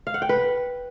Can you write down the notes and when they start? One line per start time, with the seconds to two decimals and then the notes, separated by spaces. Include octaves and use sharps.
0.07 F5
0.14 F#5
0.22 G5
0.29 B4